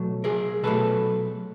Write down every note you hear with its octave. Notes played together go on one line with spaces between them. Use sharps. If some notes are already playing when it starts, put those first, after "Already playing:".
Already playing: B2 F#3 A3
G#4 A#4
B2 F#3 A3 A4 B4